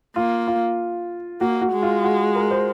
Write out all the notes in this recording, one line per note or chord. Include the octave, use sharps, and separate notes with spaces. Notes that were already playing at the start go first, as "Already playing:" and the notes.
A#3 F4
F4
A#3 F#4
F#4
G#3
F4
F#4
A#4
C5